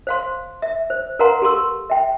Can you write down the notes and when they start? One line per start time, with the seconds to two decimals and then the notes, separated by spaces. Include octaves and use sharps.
0.07 C5 F5 C6
0.62 E5
0.90 C5
1.19 A#4 B4 F5 F#5 A#5 C6
1.42 G4 A4 C6 E6
1.90 E5 G5